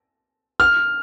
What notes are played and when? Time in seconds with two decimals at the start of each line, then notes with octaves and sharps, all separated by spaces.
0.60 F6